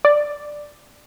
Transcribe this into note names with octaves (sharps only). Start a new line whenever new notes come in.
D5